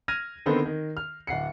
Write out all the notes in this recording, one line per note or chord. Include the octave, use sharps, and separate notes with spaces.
F6 G#6 A#6 D#7
D3 D#3 B3 C4 A4 C5
D#3
F6
D1 F#5 C7 C#7